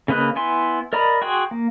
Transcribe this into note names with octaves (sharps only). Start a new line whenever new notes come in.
C#3 A#3 B4 D#5 F#6
B3 E4 G#5 C6
A#4 D5 D#5 A#5 B5
F#4 G#4 G5 C6
A#3